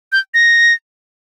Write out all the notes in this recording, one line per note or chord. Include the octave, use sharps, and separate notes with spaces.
G6
A#6